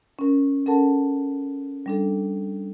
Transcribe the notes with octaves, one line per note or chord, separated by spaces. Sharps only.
C#4 A#4
C#4 A4 A#4 F#5 A5
G3 D4 A4